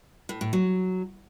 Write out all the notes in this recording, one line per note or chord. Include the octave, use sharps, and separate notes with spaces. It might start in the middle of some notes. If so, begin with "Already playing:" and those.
A2
A2
F#3